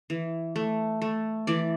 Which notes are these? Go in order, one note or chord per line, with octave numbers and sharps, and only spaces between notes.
E3
A3
A3
E3 D5